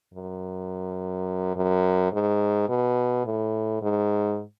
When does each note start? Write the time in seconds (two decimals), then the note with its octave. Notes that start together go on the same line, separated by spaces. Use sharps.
0.14 F#2
1.56 F#2
2.13 G#2
2.69 B2
3.26 A2
3.82 G#2